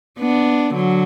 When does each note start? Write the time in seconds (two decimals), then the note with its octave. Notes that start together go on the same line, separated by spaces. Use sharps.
0.19 B3 D4
0.74 D3 F#3